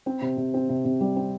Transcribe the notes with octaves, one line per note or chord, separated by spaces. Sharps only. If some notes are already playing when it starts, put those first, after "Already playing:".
C4
C3
C3
C4
C3
C3
G3
C4